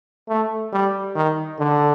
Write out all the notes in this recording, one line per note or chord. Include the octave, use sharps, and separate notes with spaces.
A3
G3
D#3
D3